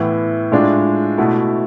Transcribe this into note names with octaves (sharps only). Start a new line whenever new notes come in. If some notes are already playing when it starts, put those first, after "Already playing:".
Already playing: A2 E3 B3 E4
A2 G#3 D4 F4
B2 A3 E4